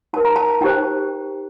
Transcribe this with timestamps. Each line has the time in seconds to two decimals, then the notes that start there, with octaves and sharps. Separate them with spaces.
0.13 D#4 A#4 A5
0.25 A#5
0.36 A5
0.61 D#4 G4 C5 G5